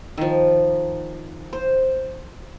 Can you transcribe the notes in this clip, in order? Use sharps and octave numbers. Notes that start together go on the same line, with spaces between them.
D#3 F3
C5